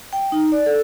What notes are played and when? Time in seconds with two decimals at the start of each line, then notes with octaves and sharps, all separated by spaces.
0.13 G5
0.32 D#4
0.52 D5
0.66 A4